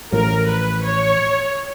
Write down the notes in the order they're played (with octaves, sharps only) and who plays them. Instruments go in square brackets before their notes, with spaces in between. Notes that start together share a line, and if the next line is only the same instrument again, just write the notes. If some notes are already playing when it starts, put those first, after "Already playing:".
[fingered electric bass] A1 A2 F3 [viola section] A#4
[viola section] B4
C#5